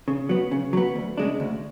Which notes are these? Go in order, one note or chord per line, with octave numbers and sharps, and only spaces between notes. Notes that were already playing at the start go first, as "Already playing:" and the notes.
C#3
F#3 B3
C#3
F#3 B3
D2
C#3 G#3 D4
D2